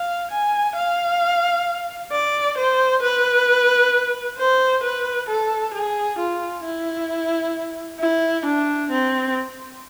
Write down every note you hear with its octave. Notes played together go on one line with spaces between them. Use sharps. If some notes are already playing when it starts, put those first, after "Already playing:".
Already playing: F5
G#5
F5
D5
C5
B4
C5
B4
A4
G#4
F4
E4
E4
D4
C4